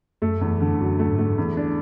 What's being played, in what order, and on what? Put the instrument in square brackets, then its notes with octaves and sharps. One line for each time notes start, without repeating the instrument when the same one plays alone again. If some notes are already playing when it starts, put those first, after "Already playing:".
[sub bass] F#2 [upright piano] A3
[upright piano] E2
D3
[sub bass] F#2 [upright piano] F#3
[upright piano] A3
[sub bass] G#2
[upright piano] A3
E2
D4